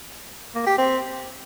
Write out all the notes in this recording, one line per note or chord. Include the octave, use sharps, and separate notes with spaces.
A#3
G4
C4